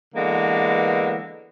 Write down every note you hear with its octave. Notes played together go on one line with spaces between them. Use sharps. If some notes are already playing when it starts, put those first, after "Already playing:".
D3 E3 G#3 A#3 B3